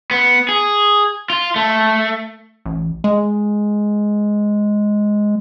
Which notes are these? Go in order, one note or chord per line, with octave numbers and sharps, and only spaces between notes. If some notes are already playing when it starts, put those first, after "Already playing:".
B3
G#4
F4
A3
A1
G#3